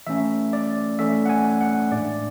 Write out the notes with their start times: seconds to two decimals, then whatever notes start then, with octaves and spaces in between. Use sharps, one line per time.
0.07 E3 A3 C#4 E5
0.53 D5
0.99 E3 A3 C#4 E5
1.26 F#5
1.29 G#5
1.61 F#5
1.91 A2 G#3 D4 D5